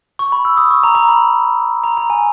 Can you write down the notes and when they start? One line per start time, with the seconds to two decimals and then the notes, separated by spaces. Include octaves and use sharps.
0.19 C#6
0.32 B5
0.45 E6
0.57 D#6
0.71 C#6
0.83 A#5
0.95 A#5
1.09 B5
1.84 A#5
1.97 A#5
2.10 G#5